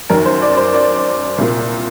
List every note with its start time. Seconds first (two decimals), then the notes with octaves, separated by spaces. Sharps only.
0.10 F#2 D#3 A#4
0.25 C5
0.42 D5
0.57 C5
0.74 D5
1.38 C2 A#2